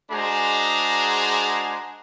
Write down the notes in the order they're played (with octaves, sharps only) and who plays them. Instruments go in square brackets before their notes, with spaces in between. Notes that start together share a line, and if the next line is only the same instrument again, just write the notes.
[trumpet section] G#3 D4 F#4 G#4 C5 A#5